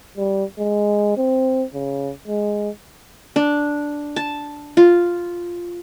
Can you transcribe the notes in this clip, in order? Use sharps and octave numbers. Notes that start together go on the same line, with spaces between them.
G3
G#3
C4
C#3
G#3
D4
A5
F4